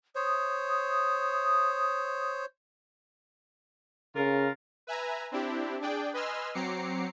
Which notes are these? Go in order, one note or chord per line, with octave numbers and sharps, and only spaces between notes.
C5 C#5 D#6
C#3 F4 A#4
B4 E5 G#5 A#5
C4 D4 E4 G4
D4 G#4 D5 G5
B4 D#5 G#5 C6 E6 F6
F#3 C4 A#5 D6 C7 C#7